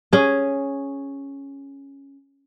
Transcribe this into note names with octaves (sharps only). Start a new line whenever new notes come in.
C#4 G#4